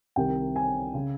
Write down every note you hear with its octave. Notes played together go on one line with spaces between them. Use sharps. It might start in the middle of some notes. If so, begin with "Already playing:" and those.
C2 C3 D#3 G5
G#5
C#3